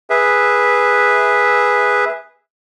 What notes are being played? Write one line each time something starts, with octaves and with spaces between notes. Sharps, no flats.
G#4 B4 E5